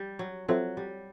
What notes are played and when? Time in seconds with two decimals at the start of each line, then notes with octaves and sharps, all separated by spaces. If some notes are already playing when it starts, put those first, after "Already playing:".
Already playing: G3
0.19 F#3
0.48 F#3 C4 F4 A4 C5 E5
0.77 G3